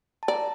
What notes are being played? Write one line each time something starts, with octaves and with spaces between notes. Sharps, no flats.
A5
D5 A#5